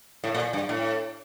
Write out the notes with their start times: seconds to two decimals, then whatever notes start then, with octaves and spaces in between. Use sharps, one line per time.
0.24 A2
0.34 A#2
0.53 G2
0.69 A2